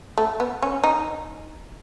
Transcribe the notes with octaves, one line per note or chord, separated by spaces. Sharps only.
A3
B3
C#4
D#4